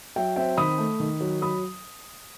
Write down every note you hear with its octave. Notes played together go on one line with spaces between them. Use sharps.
F#3 E5 G5
C4 E5 G5
D#3 B5 D#6
A3
D#3
F#3
F#3 B5 D#6